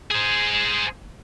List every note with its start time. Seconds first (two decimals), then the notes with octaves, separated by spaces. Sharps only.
0.11 G#4 C5